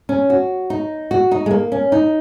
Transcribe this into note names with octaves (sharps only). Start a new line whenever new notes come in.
C#4
F#4
D#4
F#4
D#4
G#3
A#3
C#4
D#4